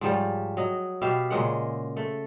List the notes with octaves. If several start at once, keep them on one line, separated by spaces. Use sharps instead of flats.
G#2 F3 G3 C#5
F#3 D#5
B2 G4 E5 F5
A#2 C#3 G#3 F#5
A3